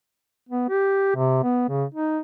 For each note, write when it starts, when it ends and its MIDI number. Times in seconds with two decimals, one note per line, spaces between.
0.49 0.68 59
0.69 1.12 67
1.15 1.41 48
1.43 1.65 59
1.69 1.85 49
1.94 2.20 63